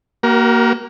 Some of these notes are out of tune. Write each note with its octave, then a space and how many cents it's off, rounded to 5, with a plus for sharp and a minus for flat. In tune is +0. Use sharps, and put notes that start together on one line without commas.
A#3 +0 F#4 +45 A#4 +30